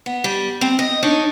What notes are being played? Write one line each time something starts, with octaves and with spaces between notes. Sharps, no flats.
B3
G3
C4
D#5
D4 D#4 C#5